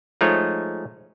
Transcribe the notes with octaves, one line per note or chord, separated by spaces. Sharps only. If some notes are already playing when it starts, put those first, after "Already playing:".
F3 G#3 A3 D#4 G#4 C#5